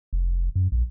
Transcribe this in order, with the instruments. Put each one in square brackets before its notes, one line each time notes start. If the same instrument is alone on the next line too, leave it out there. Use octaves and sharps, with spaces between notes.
[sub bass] F1
F#2
A#1